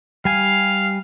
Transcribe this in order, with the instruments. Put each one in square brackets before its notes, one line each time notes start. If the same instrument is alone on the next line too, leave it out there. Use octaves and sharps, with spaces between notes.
[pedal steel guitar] G3 G#5 [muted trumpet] F5